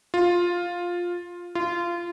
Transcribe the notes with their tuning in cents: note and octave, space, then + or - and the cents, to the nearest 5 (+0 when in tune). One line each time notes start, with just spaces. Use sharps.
F4 +10
F4 -20